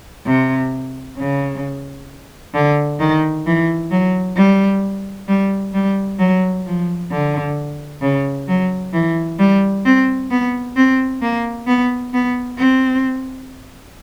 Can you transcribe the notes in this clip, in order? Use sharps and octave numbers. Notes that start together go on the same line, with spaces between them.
C3
C#3
D3
D#3
E3
F#3
G3
G3
G3
F#3
F3
D3
C#3
F#3
E3
G3
C4
B3
C4
A#3
B3
B3
C4